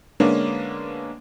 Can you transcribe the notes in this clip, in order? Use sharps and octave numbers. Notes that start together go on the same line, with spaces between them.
D3 G#3 A#3 B3 C#4 D4